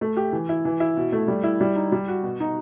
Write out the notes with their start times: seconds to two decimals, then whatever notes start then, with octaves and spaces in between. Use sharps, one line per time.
0.01 A3
0.17 G4
0.32 E3
0.49 E4
0.65 E3
0.80 E4
0.97 B2
1.12 A3
1.28 G3
1.43 E4
1.61 G3
1.76 D#4
1.92 G3
2.08 F#4
2.23 B2
2.40 D#4